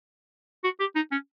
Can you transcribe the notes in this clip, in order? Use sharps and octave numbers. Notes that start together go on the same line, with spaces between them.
F#4
G4
D#4
C#4